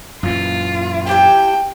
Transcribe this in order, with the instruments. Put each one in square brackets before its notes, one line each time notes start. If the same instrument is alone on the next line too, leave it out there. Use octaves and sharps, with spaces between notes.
[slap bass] F#2 A#2 E3 [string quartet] F4
[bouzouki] E4 G4 A5 [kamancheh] G5